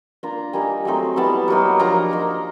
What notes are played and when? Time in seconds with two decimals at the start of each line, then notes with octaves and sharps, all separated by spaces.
0.23 A#3 D4 F4 A#5
0.53 G3 A#3 D#4 G#5
0.85 F#3 A3 C4 D#4
1.16 G3 B3 E4 A5
1.48 F#3 A#3 D#4
1.79 F3 A#3 D4 F4 A#5
2.11 A#3 D#4